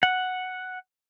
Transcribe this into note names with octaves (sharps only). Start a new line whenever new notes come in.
F#5